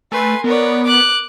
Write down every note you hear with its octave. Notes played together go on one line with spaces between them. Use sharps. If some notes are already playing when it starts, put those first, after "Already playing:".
A3 B4 G#5 C6
B3 A#4 C#5 D5
D6 F#6